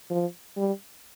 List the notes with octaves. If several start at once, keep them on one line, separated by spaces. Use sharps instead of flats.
F3
G3